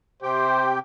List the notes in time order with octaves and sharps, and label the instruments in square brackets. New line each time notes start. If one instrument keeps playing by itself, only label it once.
[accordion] C3 G4 G5 [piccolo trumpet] C5